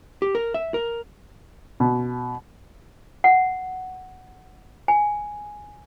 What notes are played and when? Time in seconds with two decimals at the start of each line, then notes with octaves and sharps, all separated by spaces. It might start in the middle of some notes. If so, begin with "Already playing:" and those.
0.22 G4
0.35 A#4
0.54 E5
0.74 A#4
1.80 B2
3.24 F#5
4.88 G#5